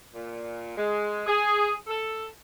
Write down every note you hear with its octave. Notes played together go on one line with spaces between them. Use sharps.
A#2
G#3
G#4
A4